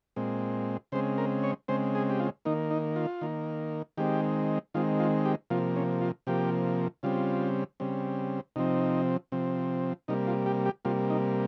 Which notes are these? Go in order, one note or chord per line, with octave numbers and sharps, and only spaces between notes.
A#2 G#3 C4
C#3 G#3 C4 C5
A#4
C#5
C#3 G#3 C4 C5
G#4
G4
F4
D#3 A#3 D#4
D#4
F4
D#3 A#3
D#3 G#3 C4 G4
D#3 G#3 C4 F4
F4
G4
C3 F3 A#3 F4
C#4
F4
C3 F3 A#3 G4
C#3 G3 C4 F4
C#3 G3 C4
C3 F3 C4 D#4
C3 F3 C4
C3 G3 A#3 D#4
F4
G4
G4
C3 G3 A#3 F4
D#4